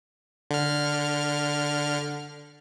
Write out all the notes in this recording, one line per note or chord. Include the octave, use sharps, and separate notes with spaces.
D3 F6